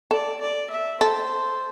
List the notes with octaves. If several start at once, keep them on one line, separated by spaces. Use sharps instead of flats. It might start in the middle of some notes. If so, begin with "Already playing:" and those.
A4 D5
D5
E5
A4 C5